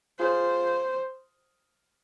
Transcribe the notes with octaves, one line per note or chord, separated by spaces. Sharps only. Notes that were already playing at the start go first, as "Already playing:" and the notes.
F4 G#4 C5